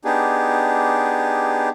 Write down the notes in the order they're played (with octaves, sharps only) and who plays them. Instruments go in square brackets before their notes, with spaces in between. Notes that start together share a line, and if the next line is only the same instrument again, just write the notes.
[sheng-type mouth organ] B3 D4 D#4 G4 G#4